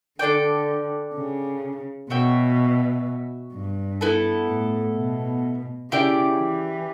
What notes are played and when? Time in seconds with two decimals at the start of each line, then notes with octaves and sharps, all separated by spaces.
0.19 D3 D4 A4 D5 G5
1.15 C#3
2.10 B2 F#4 C#5 E5 G5
3.54 G2
4.01 B3 E4 A4
4.49 A2
4.96 B2
5.91 C#3 E4 G4 D5 G5
6.39 E3